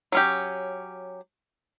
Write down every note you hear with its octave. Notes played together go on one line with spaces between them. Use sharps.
F#3 C#4 G4